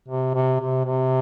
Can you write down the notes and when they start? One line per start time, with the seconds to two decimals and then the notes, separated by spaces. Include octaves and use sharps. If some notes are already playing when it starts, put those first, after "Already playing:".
0.08 C3
0.34 C3
0.60 C3
0.85 C3